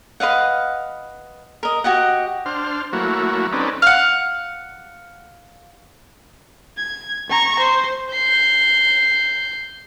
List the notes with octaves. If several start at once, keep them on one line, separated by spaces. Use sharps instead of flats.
B4 D#5 F5 F#5
A#4 D#5
F#4 G4 D#5 F#5
D4 C5 F6
F#3 A3 A#3 E4 F#4
C4 C#4 D#4 A4 B4 D5
F5 F#5
G#6
A#5 C#6
C5
G6 C7